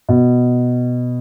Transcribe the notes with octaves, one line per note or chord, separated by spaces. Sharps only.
B2